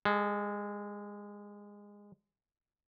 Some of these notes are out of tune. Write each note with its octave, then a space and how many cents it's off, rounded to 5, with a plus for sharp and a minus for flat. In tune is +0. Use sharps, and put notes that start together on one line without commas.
G#3 -20 A4 -45